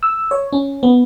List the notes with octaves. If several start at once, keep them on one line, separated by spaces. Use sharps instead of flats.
E6
C#5
C#4
B3